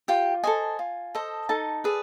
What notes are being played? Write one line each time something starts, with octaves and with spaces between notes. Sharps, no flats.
F4 G4 G5
G#4 A4 C5 D#5 G#5
F4
A4 C5 D#5
D#4 A4 A5
G#4 B4 D5